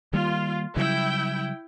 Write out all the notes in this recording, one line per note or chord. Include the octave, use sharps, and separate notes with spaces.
D#3 G3 A#3 F4
C#3 F#3 G3 E4 G5